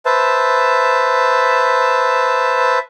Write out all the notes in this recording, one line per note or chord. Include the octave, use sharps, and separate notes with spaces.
B4 C5 E5 A5